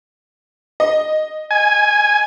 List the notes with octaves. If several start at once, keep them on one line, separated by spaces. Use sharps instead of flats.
D#5
G#5